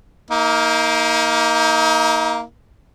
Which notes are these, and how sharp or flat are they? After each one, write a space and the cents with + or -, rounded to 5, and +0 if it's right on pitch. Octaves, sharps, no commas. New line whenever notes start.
A#3 +0 D#4 +40